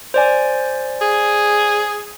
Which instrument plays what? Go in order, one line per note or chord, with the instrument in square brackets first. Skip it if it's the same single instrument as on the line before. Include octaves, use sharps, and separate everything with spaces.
[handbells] C5 D5 G#5
[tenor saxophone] G#4